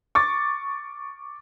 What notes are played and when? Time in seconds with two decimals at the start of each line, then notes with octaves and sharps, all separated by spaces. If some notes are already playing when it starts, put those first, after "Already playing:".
0.15 C#6 D6 A6